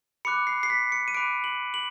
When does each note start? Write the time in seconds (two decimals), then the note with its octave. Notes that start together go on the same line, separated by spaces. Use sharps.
0.25 B5 D6 F#6 C#7
0.47 C7
0.63 C7
0.70 B6
0.92 C#7
1.08 D#7
1.14 B5 D6 F#6 D7
1.44 F#7
1.74 F#7